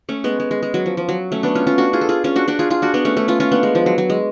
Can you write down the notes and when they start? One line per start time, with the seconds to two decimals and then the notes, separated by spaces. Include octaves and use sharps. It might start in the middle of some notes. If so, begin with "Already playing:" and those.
0.09 A3 C#4
0.24 G#3 B3
0.40 G#3
0.51 G#3
0.63 G#3
0.74 F#3
0.86 F3
0.97 F3
1.09 F#3
1.32 A3 C#4
1.43 B3 D4
1.55 C#4 F4
1.67 C#4 F4
1.78 D4 F#4
1.93 F4 G#4
2.01 A4
2.09 F4 G#4
2.24 C#4 F4
2.36 D4 F#4
2.48 D4 F#4
2.59 F4 G#4
2.70 F4 G#4
2.82 D4 F#4
2.94 B3 D4
3.05 A3 C#4
3.17 A3 C#4
3.28 C#4 F4
3.40 C#4 F4
3.52 B3 D4
3.63 G#3
3.75 F3
3.86 F#3
3.98 F#3
4.10 G#3